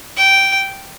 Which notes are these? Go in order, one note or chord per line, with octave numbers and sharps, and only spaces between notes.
G5